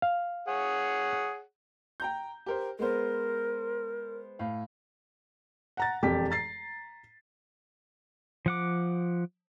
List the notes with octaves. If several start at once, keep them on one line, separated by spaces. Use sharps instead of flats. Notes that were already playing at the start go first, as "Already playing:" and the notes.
F5
G#4 C#5 F#5
G5 A#5 G6
G4 A#4 C5
G#3 B3 A#4 C5
A2 F5
F#5 A#5 A6
E1 F2 G4 B6
A#5 A6 C7
F3 F#5 D6